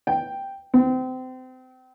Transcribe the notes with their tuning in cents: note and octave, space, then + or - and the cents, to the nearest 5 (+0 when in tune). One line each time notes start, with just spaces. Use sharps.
G5 +0
C4 -30